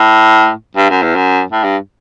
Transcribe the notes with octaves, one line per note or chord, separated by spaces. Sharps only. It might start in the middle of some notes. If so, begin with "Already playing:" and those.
Already playing: A2
G2
F#2
E2
F#2
A2
G2